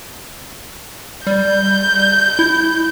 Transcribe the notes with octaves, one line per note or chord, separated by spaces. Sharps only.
G3 G6
E4